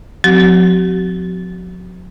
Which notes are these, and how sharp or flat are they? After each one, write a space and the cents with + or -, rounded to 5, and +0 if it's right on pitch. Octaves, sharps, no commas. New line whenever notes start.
F#3 -45 C4 -15 F#4 +45